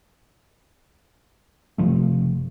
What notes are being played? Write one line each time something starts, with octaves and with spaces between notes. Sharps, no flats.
F#1 C3 F3 A3